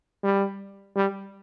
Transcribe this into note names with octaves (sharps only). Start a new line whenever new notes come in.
G3
G3